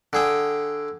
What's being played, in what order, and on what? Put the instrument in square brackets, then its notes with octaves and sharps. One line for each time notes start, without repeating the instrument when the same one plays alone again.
[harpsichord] D3 G#4 G5